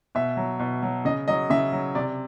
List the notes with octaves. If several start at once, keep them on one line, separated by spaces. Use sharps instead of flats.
B2 E5
F#3
B2
F#3
C#3 D#5
F#3 D#5
C#3 E5
F#3
C3 D5